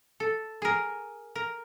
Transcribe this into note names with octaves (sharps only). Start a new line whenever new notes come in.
A4
G#4 A#4
A#4